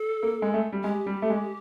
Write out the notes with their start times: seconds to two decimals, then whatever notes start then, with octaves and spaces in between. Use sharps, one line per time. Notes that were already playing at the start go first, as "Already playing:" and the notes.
Already playing: A4
0.23 A#3
0.42 G#3
0.54 A3
0.72 G3
0.84 G#3 G4
1.06 G3
1.22 A3
1.30 G#3